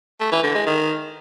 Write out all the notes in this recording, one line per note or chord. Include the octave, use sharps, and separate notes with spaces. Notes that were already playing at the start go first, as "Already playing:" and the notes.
A3
E3
D3
G#3
D#3